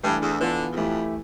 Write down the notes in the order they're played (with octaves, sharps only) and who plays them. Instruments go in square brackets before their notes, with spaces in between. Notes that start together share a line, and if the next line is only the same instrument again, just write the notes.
[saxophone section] G2 [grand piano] E3 A3 D4 A4
[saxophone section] E2
[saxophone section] D3 [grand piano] E3 B3 F4
[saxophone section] E2
[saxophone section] F2 [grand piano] A2 E3 A3 E4 G4